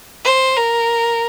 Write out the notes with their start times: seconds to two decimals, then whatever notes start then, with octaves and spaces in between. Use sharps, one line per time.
0.24 C5
0.57 A#4